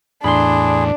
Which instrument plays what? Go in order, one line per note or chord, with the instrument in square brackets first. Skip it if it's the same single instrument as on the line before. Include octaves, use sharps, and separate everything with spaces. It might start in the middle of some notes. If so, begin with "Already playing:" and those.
[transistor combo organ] E2 A2 [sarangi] D4 [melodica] G#4 [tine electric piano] B5 C6